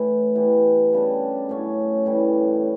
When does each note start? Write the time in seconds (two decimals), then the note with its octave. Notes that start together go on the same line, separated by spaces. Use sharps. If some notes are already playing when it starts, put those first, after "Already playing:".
Already playing: A2 E3 A3 D4
0.35 E3 B3 D4 G4
0.93 C#3 G3 D4 A4
1.49 A2 F#3 C#4
2.06 A2 E3 G3